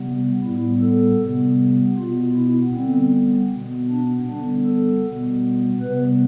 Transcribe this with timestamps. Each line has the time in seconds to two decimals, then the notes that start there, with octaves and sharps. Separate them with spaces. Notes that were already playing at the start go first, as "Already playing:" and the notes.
Already playing: C3 G3 B3
0.44 A2 G3 B3 E4
0.82 A4
1.21 C3 G3 B3
1.97 B2 B3 F4
2.35 E4
2.74 D3 G3 B3 C4
3.51 B2 B3
3.89 D4
4.28 D3 G3 B3 D4
4.66 A4
5.04 B2 G3 B3
5.81 C3 G3 B3 B4